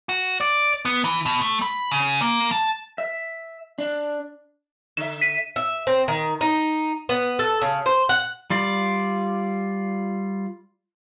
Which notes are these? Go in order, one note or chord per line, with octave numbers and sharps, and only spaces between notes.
F#4
D5
B3
E3
B2
A3
B5
C#3
A#3
A5
E5
D4
D3 E5 E7
B6 D#7
E5
C4
D#3
D#4
B3
A4
C#3
C5
F#5
G3 F4 D5